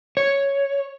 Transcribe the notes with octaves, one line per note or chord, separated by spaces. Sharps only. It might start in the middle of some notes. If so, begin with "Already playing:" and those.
C#5